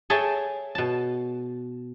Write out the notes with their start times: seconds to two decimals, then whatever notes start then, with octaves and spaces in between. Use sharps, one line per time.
0.10 G#4 A4 C#5 E5 G5 A5
0.75 B2 A5